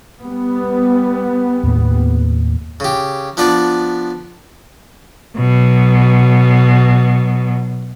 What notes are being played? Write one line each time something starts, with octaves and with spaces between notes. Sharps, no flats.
G3 B3
D#2 A2 A#3
C#3 G4
F3 B3 D4 B4 D5
B2 F#3